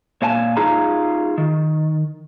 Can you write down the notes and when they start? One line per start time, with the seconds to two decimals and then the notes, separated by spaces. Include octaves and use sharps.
0.22 A#2 C#5 F5 G#5 A5
0.57 D#4 F4 G#4 F5 A#5
1.38 D#3